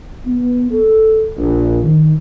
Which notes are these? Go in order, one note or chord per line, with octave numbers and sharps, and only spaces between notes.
B3
A4
A#1
D#3